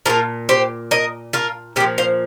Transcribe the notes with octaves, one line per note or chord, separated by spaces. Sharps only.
A#2 F3 F4 A#4
G4 C5
A#4 D#5
F4 A#4
A#2 F3 G4 C5
C5 F5